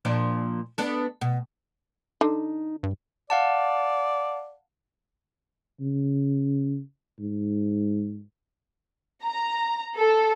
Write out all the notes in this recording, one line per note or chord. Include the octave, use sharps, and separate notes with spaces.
A#2 F3 D4
B3 D4 A4
B2
D3 D#4
G2
D5 F5 F#5 A5
C#3
G#2
A#5
A4